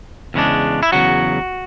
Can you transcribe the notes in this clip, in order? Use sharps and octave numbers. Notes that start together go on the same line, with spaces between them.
E2 C#3 G#3 D4
E4
E2 C#3 F#3 F#4